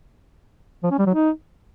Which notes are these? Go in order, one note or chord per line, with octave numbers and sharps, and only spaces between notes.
F3
C#4
G3
F#3
D#4